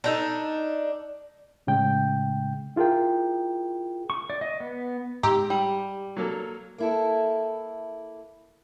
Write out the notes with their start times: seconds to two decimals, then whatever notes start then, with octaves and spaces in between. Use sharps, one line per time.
0.04 D4 D#4 A4
1.67 A2 C#3 G#3 G5 G6
2.76 E4 F4 G#4 A#4 G5
4.10 C#6
4.30 D5
4.41 D#5
4.60 B3
5.23 G#2 G4 A#5 C6 D6 E6
5.50 G3
6.17 F#3 A#3 A4
6.78 A#3 E4 A4